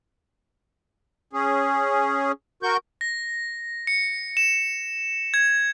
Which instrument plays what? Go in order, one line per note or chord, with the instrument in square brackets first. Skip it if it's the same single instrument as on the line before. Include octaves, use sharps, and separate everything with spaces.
[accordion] C#4 G#4
F#4 A#4 C#6 G6
[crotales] A#6
C#7
E7
G#6